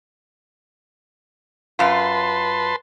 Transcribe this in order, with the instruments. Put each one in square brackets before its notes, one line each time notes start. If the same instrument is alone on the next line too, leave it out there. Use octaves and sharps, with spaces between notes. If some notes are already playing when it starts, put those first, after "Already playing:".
[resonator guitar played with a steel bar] F#2 F4 [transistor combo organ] B4 A5 C6